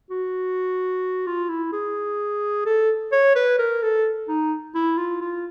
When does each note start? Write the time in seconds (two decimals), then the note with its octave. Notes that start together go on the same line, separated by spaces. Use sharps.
0.10 F#4
1.27 F4
1.50 E4
1.73 G#4
2.66 A4
3.12 C#5
3.36 B4
3.59 A#4
3.83 A4
4.28 D#4
4.75 E4
4.98 F4
5.21 F4